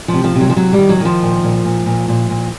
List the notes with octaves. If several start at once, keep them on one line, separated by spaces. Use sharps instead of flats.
F3
C3
F3
C3
F#3
F3
C3 F#3
G3
D#3
F#3
D#3 F3
A#2
A#2
A#2
A#2
A#2
A#2